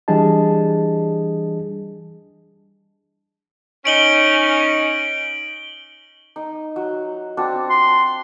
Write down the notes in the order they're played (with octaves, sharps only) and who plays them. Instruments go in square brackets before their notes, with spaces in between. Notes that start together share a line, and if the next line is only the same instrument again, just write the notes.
[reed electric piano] E3 G3 D4 G#4 D#5 A5
[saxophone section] C#4 D#4 [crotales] D7 F#7 G7
[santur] D#4
F#3
C4 D4 F#4
[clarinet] C6